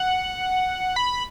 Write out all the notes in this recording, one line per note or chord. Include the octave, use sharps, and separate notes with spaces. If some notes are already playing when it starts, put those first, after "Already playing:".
Already playing: F#5
B5